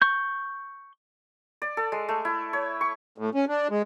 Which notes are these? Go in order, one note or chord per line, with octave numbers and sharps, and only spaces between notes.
C#6 G6
D5
A4
G#3
A3
E4
C#5
C#6
A2
C#4
D4
G#3